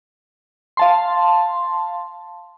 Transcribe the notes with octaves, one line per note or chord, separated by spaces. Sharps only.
F5 A5 C6